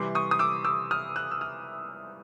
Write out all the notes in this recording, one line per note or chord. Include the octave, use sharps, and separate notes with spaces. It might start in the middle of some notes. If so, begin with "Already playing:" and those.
Already playing: C3 E3 G3 C6 D6
C#6 D#6
D#6
D6 E6
D6 E6
D#6 F6
E6 F#6
E6
D#6 F6